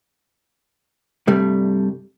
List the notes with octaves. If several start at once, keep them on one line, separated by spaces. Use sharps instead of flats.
G2 C3 G3 A3